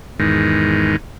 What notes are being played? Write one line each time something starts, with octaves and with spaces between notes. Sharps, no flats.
E2 G#2 D#3